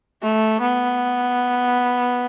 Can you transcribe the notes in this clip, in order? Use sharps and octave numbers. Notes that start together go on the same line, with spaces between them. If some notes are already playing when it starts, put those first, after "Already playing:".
A3
B3